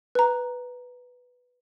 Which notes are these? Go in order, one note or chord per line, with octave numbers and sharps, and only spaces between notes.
B4 A#5